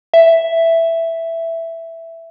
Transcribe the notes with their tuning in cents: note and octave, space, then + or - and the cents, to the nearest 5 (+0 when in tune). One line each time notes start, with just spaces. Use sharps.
E5 +5